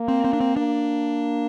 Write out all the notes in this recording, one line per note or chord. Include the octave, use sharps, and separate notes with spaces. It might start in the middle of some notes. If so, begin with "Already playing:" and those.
Already playing: A#3
C4
C4
D4
C4
A#3 D4